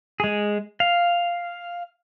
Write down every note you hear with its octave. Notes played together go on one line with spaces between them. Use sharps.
G#3 G#4
F5